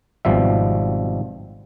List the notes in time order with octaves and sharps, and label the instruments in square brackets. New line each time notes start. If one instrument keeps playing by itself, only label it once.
[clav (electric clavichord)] G#1 B2 F3 G3 E5